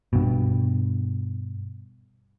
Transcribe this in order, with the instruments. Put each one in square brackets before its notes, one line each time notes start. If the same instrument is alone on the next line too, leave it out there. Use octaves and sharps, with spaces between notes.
[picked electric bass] G2 B2